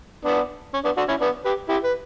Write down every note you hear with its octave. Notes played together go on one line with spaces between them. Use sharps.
B3 D4
C#4
B3 D4
D4 F#4
C#4 E4
B3 D4
G4 B4
E4 G4
B4